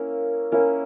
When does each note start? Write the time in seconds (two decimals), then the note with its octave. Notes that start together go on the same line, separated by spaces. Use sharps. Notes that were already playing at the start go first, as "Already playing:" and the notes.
Already playing: A#3 C#4 E4
0.52 A#3 C#4 E4